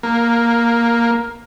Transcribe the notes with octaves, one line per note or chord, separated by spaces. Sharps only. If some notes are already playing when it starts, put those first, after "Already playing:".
A#3